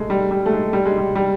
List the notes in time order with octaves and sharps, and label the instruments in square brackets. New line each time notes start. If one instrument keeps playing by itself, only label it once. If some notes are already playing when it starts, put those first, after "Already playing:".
Already playing: [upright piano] G#3 A3
G3
G3
A3
G#3
G3
G#3
G3
G3